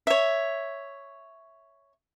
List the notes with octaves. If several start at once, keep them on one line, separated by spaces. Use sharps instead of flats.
C#5 E5